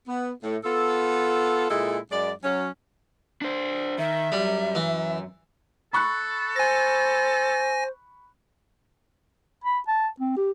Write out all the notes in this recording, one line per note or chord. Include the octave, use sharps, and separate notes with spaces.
B3
A2
B3 F4 A4
A#2 G#3 E4 G#4 A4
F#2 G#3 D5
F#3 C#4
D4 C5
D#3 E5
F#2 G3
E3
A4 B5 C#6 F#6
C5 G#5 A#6
B5
A5
C4
G4